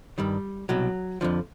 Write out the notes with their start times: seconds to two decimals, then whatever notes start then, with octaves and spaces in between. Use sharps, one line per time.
0.18 G2 D#3 G3
0.69 C2 B2 F#3
1.21 F2 D3 F3